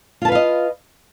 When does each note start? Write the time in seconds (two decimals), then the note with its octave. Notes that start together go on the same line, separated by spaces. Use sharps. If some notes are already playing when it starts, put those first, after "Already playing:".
0.22 F4
0.25 A5
0.28 B4
0.32 F5
0.35 D#5